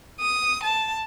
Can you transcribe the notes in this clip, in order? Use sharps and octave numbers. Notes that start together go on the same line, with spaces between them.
D#6
A5